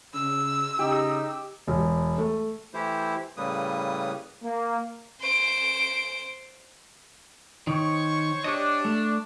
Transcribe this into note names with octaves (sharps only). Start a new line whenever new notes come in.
C#3 E6
C#3 D#4 G4
E1
A3
E3 A3 E4 G4 C5
A2 C#3 G3 A#3 B4 D#6
A#3
C5 D7
D#3 C5 C#5 C#6
D4 G4 C#5 D#5
A3